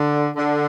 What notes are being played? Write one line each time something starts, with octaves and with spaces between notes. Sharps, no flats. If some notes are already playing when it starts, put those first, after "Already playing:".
Already playing: D3
D3